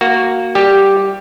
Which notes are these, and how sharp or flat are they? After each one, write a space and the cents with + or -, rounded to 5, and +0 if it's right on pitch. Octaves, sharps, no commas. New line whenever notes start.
A#3 -10 F#4 +0
G3 +0 G4 +0